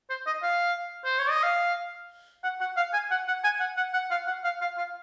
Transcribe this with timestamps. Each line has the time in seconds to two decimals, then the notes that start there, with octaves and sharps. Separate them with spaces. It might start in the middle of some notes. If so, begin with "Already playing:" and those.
0.10 C5
0.26 D#5
0.43 F5
1.04 C5
1.18 C#5
1.30 D#5
1.43 F5
2.44 F#5
2.61 F#5
2.77 F5
2.93 G#5
3.11 F#5
3.28 F#5
3.44 G#5
3.60 F#5
3.77 F#5
3.93 F#5
4.11 F5
4.27 F#5
4.44 F5
4.61 F5
4.77 F5